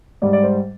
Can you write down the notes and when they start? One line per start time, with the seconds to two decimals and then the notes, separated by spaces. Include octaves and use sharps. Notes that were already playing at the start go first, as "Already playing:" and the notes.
0.22 G#2 G3 D5
0.33 D5
0.44 C5